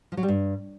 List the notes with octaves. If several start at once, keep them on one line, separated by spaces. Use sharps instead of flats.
F3
F#3
G3
G2